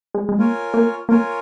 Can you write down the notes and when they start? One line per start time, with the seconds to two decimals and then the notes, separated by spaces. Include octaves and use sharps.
0.14 G#3
0.29 G#3
0.38 A#3 F4 A#4 C#5 G#5
0.74 A#3
1.09 A#3 F4 A#4 C#5 G#5